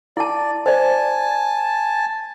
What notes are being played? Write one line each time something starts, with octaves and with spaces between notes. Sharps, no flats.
E4 D5 A5
C5 D5 G#5 A5